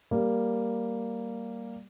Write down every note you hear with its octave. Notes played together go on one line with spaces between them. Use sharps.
G3 A#3